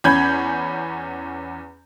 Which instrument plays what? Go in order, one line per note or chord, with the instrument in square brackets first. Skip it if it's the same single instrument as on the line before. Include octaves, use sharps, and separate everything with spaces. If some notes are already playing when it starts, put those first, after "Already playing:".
[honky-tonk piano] E2 C#4 B5 G6 G#6